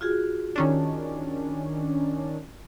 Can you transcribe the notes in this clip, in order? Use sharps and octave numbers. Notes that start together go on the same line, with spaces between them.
F4 F#4 G#4
D#3 C#4 D4